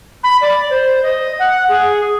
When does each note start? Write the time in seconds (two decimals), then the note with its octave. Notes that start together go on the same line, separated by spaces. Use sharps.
0.23 B5
0.41 D5
0.70 C5
1.03 D#5
1.39 F#5
1.68 G#4